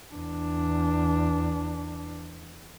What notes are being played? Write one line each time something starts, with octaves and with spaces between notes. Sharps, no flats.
E2 D4